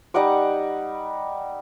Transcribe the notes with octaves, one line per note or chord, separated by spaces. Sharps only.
G3 D#4 F#5 D6